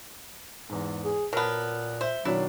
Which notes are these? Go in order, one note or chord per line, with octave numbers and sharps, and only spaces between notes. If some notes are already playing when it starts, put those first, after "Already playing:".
E2 G#2
G#4
A#2 F#3 B3 A#4 A5
C5 E5
B2 D#3 F#3 D4 E4